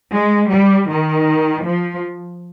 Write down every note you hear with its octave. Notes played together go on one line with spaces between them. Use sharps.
G#3
G3
D#3
F3